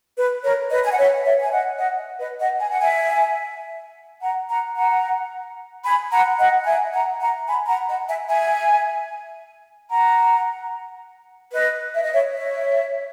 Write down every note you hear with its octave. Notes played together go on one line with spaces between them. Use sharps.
B4
A#4 C#5
B4 D#5
G#5
F#5
C#5 E5
C#5 E5
G#5
D#5 F#5
D#5 F#5
B4 D#5
D#5 F#5
G#5
F#5
E5 G#5
F#5 A#5
F#5 A#5
F#5 A#5
G#5 B5
F#5 A#5
D#5 F#5
E5 G#5
F#5 A#5
F#5 A#5
G#5 B5
F#5 A#5
D#5 F#5
E5 G#5
E5 G#5
F#5 A#5
B4 D#5
E5
D#5
C#5 E5
C#5 E5